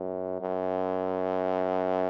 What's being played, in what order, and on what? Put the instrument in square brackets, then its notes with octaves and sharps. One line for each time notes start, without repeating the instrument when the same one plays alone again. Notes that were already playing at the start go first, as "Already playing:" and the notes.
Already playing: [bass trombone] F#2
F#2